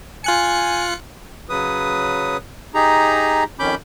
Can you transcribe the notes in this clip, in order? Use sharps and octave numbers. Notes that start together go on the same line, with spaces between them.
F4 G#5 F#6 C#7
C#3 F#3 B4 D#6
D#4 G4 G#4 A#5
F2 D#3 C#4 B5 D6 G6